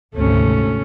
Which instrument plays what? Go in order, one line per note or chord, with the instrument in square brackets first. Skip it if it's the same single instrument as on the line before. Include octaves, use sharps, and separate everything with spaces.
[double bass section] G#1 D2 C3 [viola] A3 C#4